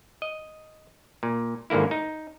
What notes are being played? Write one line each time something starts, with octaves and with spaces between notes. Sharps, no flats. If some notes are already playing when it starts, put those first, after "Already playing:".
D#5
A#2
G#1 G#2 D3 A#3 E4
D#4